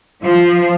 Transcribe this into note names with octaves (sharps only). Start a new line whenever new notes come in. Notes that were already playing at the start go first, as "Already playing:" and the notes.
F3